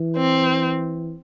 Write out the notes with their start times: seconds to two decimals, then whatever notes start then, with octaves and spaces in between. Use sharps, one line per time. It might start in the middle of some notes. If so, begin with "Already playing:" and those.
Already playing: E3
0.17 C4